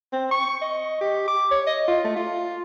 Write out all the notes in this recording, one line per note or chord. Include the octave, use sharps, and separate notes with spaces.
C4
C#6
D#5
G4
D6
C#5
D#5
F4
A3
F4